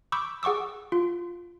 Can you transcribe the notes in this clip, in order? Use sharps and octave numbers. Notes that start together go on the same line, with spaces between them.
B5 C#6 D6 E6 G6
G#4 F#5 C#6 D6 E6
F4